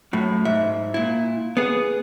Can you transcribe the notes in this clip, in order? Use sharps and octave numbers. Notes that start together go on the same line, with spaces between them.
F#2 A2
G#2 E5
A#2 E4
B3 G#4